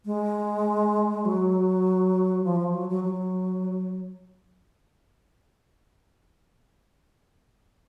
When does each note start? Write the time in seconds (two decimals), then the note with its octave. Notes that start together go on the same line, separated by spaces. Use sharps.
0.06 G#3
1.25 F#3
2.44 F3
2.60 F3
2.74 F#3
2.90 F#3
3.04 F#3